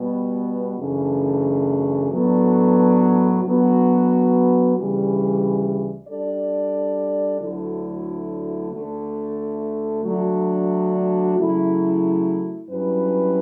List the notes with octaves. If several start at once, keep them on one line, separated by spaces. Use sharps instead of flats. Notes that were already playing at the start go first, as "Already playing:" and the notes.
Already playing: B2 G3 B3
F#2 C#3 E3 A3 D4
A2 F#3 B3 D4 A4
D3 F#3 B3 F#4
D2 C#3 E3 G3
G3 D4 A4 D5
D2 D3 F#3 A3 E4
D2 D3 A3
D3 F#3 A3 D4 F#4
C#3 F#3 A3 E4
G2 F#3 C#4 E4 B4